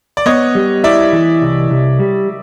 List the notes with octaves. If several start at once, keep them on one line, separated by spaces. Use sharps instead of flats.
D5
B3 C#5 D#5
G3
E4 D5 E5
E3
C2
C2
G3